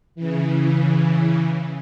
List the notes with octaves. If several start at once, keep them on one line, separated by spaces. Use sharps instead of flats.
C#3 E3